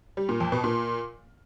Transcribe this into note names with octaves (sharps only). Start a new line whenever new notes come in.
G3
A#2
F2
B2
A#2